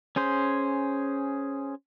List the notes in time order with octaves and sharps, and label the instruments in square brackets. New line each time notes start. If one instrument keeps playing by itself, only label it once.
[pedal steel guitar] C#4 G#4 C5